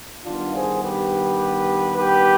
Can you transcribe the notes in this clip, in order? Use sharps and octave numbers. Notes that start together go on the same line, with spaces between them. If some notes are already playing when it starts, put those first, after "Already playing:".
G2 D#3 B3 D4 F4
G#4 C5
G4 B4
G4 B4